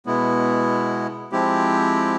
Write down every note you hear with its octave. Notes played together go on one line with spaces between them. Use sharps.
B2 G#3 B3 E4
F3 G#3 C4 E4 G4